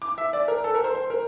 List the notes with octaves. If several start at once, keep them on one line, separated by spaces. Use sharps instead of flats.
D6
E5
D5
A#4
A4
A#4
C5
C5
A#4